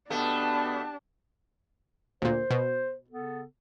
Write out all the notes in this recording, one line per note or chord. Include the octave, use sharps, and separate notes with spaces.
B2 A3 B3 D4 G4 A5
D2 A#2 C5
B2
C#3 B3 A4